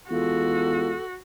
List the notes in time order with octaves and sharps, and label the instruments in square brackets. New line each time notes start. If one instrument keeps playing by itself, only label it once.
[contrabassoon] E2 [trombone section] G#3 F4 [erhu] F#4 [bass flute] A4